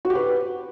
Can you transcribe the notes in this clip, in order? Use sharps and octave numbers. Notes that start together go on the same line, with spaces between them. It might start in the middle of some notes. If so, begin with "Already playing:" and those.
F#4
G4
B4